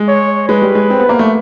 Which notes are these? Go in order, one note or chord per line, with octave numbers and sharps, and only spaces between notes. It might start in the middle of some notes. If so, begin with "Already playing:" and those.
Already playing: G#3
C#5
G#3 B4
G3
G#3
C4
B3
A#3
A3